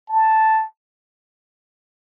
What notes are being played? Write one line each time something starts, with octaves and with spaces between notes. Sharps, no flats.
A5